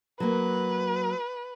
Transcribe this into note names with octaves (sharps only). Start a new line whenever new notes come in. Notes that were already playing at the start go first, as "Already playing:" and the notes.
F#3 A#3 B4